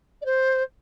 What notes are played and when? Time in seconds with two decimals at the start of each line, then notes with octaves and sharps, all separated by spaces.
0.21 D5
0.25 C5